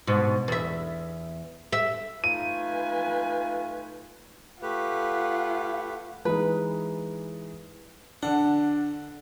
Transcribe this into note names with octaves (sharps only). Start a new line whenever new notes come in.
G#2 B2
E2 E5
E5
A3 D#4 F4 B4 G#5 D#7
A3 F4 G4 B4 F#5
E3 G#3 D#4 B4
D3 D4 F#5